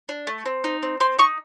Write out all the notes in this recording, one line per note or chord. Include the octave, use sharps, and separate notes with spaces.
D4
A3
C4
D#4
C4
C4 C6
D#4 C#6